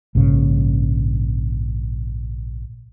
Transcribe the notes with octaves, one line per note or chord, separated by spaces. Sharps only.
A#1 G#2 C#3